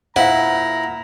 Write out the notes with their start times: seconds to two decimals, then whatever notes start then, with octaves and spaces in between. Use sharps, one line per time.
0.16 A#2 E4 C5 F5 F#5 A#5